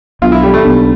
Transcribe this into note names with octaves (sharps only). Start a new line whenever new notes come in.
B1 B2 B3 D4 F4
E4
G3
A3
B1 B2 B3 D4